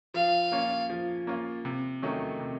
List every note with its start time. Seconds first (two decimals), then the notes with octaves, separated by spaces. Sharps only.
0.14 F3 F5
0.52 A#3 C#4 F4
0.90 F3
1.27 A#3 C#4 F4
1.65 C3
2.02 D#3 F#3 A3 C#4
2.40 C3